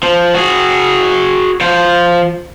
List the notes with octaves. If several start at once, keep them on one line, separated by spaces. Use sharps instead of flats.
F3
F#4 G#4
F3 C5